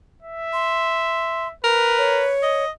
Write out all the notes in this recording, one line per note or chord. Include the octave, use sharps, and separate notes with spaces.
E5
C6
A#4 B4
C#5
D#5